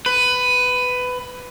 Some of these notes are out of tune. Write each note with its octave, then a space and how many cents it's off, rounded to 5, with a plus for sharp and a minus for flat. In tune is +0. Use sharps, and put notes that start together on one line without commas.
B4 +15